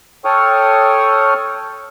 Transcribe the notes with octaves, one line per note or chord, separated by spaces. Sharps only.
A4 C#5 G5 C#6 D#6 F6